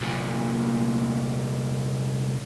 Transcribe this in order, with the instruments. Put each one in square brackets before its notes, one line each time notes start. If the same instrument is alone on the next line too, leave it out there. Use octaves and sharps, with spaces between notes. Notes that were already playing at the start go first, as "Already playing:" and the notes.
[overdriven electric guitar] C2 A#2